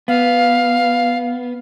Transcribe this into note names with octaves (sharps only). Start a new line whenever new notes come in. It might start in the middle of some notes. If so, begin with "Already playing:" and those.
B3 F5